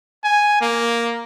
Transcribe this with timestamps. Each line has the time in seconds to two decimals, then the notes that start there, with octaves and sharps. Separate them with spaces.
0.24 G#5
0.61 A#3